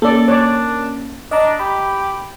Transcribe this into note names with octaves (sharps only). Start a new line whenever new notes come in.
A#3 C#4 A4 D5
D4 C#5 D5
D4 D#5 A#5
G4 B5